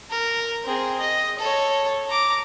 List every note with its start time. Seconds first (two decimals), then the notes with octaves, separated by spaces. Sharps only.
0.10 A#4
0.64 C4 G#4
1.00 D#5
1.39 A4 C#5
2.09 A#5 D6